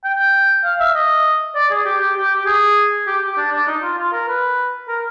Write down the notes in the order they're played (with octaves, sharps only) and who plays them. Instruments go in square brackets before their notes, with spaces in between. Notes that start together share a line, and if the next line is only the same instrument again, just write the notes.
[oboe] G5
F5
E5
D#5
D5
G#4
G4
G4
G4
G4
G#4
G4
G4
D4
D4
D#4
F4
F4
A#4
B4
A#4